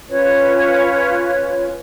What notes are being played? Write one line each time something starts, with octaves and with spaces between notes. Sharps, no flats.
C#4 F4 B4 C#5